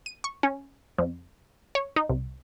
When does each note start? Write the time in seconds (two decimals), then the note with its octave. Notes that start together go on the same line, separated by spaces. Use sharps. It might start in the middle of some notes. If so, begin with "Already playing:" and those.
0.06 D#7
0.24 C#6
0.43 C#4
0.98 F2
1.75 C#5
1.96 D#4
2.09 C2